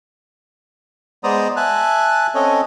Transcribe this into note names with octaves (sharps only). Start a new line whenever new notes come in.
G#3 B3 C5 D5 A#5 D#6
E5 G#5 A5 F#6
C4 C#4 A4 C#5 D#5